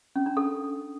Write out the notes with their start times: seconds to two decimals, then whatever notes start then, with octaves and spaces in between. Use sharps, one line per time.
0.16 C#4
0.26 D4
0.37 A4